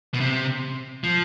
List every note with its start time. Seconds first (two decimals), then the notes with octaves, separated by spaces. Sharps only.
0.14 B2
0.20 C3
1.04 F3